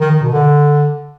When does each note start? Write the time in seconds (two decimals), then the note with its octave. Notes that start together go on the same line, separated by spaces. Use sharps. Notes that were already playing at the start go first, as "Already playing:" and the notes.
0.01 D#3
0.11 D#3
0.22 B2
0.33 D3